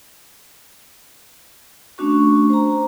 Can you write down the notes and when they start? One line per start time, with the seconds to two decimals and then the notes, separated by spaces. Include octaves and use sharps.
1.98 A3 C#4 D4 F#4 C#6
2.50 C5 A#5